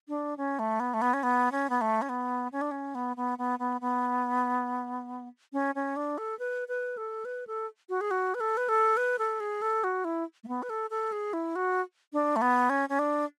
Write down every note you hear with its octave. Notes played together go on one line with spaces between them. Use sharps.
D4
C#4
A3
B3
A3
B3
C#4
B3
C#4
B3
A3
C#4
B3
C#4
D4
C#4
B3
B3
B3
B3
B3
C#4
C#4
D4
A4
B4
B4
A4
B4
A4
F#4
G#4
F#4
B4
A4
B4
A4
B4
A4
G#4
A4
F#4
E4
A3
B3
B4
A4
A4
G#4
E4
F#4
D4
A3
B3
C#4
C#4
D4